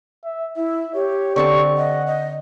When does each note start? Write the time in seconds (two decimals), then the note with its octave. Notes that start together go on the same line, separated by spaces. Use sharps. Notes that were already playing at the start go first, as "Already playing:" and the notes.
0.25 E5
0.57 E4 E5
0.94 G4 C#5
1.36 D3 C4 A5 C#6
1.77 D#5 F#5
2.07 D#5